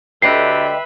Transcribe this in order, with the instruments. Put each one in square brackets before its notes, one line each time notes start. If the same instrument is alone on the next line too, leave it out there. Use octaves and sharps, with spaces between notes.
[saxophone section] D2 D3 G4 [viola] B4 E5 [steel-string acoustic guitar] D#5 G5 [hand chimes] C7